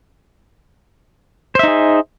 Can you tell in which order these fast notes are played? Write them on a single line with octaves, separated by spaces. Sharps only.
C5 E5 D#4 G#4